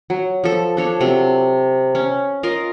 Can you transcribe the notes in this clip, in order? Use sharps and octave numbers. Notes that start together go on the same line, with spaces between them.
F#3
F3 A4
D4 A4 C#5
C3 F#3
C#4
F4 A#4 D#5 F5